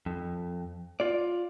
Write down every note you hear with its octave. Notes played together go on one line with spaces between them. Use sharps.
F2
F4 D5